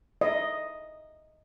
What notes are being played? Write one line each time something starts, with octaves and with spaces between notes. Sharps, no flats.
D#5 E5